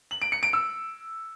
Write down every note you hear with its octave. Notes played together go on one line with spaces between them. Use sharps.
F#7
D7
C#7
D7
E6